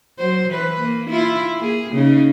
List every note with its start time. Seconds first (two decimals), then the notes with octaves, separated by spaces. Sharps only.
0.19 F#3 C5
0.50 E3 B4
0.80 A#3
1.10 E4 F4
1.59 A#3 G#4
1.94 C#3 D#4